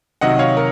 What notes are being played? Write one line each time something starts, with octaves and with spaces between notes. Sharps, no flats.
C3 D#3 F#3 D#5 F#5
C#5 F5
A#4